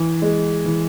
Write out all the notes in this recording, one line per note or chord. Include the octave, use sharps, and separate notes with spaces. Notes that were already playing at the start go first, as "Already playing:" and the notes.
Already playing: E3
G#3
E3